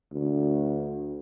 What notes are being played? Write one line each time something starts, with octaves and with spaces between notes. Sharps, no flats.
D2